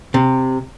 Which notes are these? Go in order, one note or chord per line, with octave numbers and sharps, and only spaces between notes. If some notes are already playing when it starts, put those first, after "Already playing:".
C3